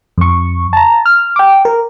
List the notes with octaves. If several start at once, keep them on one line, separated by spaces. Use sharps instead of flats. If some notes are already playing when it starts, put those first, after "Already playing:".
F2 C#6
A5 A#5
F6
G5 D6
A#4